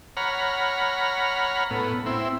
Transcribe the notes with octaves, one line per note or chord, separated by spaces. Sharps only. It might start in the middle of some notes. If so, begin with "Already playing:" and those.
C#5 F#5 A#5 B5 F6
A2 B3
C4 E4